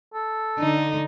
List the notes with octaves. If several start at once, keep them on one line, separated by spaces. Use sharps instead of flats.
A4
D3 D#4